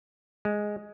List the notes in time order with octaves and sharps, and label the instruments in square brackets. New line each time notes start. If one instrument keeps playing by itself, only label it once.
[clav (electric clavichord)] G#3